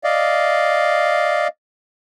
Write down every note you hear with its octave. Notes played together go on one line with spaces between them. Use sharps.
D5 D#5 F5